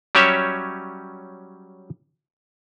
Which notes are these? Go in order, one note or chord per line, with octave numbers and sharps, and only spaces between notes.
F#3 G3 C#4 G4 C#5 E5